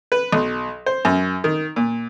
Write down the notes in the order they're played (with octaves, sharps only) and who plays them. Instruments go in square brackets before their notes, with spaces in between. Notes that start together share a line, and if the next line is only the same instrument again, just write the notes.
[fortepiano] B4
B1
C5
F#2
D#3
A#2